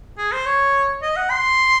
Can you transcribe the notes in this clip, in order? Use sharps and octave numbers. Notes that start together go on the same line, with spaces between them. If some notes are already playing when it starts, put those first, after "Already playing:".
G#4
C5
C#5
D#5
F#5
C6